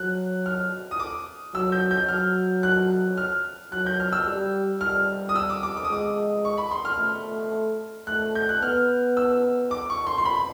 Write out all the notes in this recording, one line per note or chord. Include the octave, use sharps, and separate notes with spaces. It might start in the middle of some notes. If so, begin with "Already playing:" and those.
Already playing: F#3 F#6
F6
D#6
D6
F#3 E6
G6
G6
F#3 F6
F#6
F6
F#3 F#6
G6
F6
E6
G3
G3 F6
D#6
E6
D6
D6
D6
D#6
G#3 D6
C#6
B5
C6
F6
A3
A3 F#6
G6
F#6
B3 F6
E6
D6
C#6
C6
C6
B5